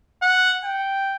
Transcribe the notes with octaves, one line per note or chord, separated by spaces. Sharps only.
F#5
G5